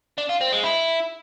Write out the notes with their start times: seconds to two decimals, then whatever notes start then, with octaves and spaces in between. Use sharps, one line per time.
0.18 D4
0.29 F4
0.41 C4
0.52 G#3
0.64 E4